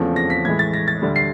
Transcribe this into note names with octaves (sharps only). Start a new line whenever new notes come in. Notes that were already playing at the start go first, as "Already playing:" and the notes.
Already playing: E2 C#3 F3 A3 C4
A#6
B6
A2 E3 G#3 G#6
A6
A#6
A6
D2 D3 G3
C7